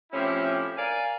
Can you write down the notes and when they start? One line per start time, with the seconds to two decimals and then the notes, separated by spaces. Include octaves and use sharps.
0.12 A2 F3 C4 C#4 E4 G4
0.77 A#4 D5 F5 G#5